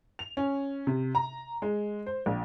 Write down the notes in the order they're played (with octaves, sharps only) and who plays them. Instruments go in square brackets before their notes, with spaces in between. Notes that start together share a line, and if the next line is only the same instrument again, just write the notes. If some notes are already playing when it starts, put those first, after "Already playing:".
[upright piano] F7
C#4
C3
A#5
G#3
C5
A#1